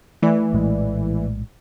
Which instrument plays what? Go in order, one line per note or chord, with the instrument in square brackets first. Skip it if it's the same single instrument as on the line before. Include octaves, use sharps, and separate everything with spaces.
[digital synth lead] E3 [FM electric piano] A3 D5
[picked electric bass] A#1 A2 G#3